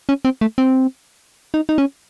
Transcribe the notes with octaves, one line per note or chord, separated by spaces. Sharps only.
C#4
C4
A3
C4
D#4
D#4
C#4